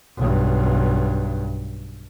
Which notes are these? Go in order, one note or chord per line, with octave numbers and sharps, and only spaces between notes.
B1 G2